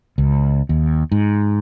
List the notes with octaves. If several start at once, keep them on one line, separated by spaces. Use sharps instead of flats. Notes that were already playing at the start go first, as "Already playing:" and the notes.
C#2
D#2
G#2